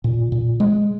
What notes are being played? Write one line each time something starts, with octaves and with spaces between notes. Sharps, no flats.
A#2
A#2
G#3